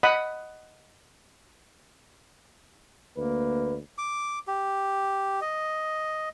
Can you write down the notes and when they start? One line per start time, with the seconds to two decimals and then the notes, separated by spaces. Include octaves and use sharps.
0.03 D#5 F#5 B5 D#6
3.17 D2 A#3 B4
3.98 D6
4.48 G4
5.41 D#5